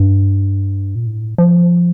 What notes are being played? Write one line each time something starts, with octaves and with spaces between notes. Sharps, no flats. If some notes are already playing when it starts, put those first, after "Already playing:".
Already playing: G2
A#2
A2
F3